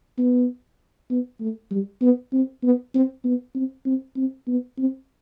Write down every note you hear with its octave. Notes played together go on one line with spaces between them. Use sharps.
B3
B3
A3
G3
B3
C4
B3
C4
B3
C4
C4
C4
B3
C4